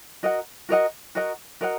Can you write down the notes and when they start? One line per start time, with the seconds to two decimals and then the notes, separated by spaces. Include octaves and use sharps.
0.23 F#4 A#4 D#5 F#5
0.69 F#4 A#4 D#5 F#5
1.15 F#4 A#4 D#5 F#5
1.61 F#4 A#4 D#5 F#5